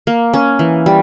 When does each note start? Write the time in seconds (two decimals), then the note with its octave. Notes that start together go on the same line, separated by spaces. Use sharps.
0.07 A#3
0.34 C#4
0.59 E3
0.86 G3